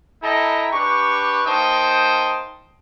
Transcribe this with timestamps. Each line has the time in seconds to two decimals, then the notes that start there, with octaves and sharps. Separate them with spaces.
0.23 E4 A4 D#5 G5 A#5
0.72 D4 G4 B4 C#6
1.47 A#3 D#4 C5 G5 A5 D#6